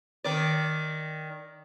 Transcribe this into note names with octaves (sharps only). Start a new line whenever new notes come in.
D#3 D5